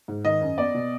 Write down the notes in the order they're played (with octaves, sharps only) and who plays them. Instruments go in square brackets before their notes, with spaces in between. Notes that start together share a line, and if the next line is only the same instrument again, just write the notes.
[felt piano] G#2
[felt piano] D#3 [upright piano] D#5
[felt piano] F#2
[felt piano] B3 [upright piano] D5
[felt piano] B2